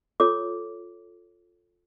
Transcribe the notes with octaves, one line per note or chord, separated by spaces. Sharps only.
F4 A4 C#5 D6